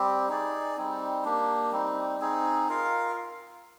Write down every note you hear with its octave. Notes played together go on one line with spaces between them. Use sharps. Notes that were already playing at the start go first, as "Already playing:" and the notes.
Already playing: G3 C4 G4
D#4 G#4 D5
G3 C4 D#4
A#3 D4 G4
G3 C4 D#4
C4 D#4 G#4
F4 A#4 F5